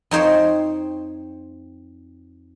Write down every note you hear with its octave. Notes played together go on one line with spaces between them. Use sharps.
F2 D#4 C5 C#5 G5